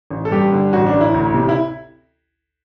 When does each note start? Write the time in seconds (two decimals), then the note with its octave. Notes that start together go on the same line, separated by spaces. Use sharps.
0.11 A1
0.25 A4
0.31 G2 G4
0.51 D3
0.73 A1 F#4
0.86 D4
0.93 A1
1.01 E4
1.14 D2
1.34 C3
1.49 E4